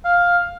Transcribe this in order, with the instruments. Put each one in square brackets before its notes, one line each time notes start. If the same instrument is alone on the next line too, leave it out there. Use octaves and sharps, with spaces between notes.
[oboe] F5